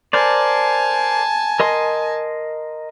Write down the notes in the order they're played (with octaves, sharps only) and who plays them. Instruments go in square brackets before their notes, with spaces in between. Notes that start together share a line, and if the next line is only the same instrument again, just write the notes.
[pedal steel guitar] A#4 C5 D5 [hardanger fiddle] G#5 A5
[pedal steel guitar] A#4 D#5 C6